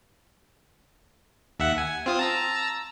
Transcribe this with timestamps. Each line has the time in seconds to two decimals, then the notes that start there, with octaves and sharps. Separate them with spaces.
1.59 D#2 E5 F#5
1.78 G#5
2.06 C4 F4 D#6
2.19 A5 A#5 E6